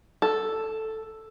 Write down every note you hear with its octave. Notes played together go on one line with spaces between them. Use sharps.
A4